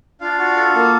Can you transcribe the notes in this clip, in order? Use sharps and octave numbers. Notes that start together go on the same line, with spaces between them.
D4 F4 F5
F#4
A4
A#3